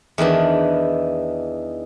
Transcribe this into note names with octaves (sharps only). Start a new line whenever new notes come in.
E2 D#3 E3 D4